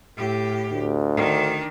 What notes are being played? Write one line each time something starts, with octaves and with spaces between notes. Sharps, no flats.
A2 G4
D2
D#3 D4